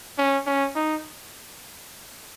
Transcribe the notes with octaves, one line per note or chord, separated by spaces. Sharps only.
C#4
C#4
D#4